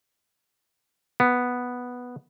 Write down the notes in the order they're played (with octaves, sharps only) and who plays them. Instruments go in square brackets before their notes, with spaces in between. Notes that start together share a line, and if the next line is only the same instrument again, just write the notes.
[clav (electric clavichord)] B3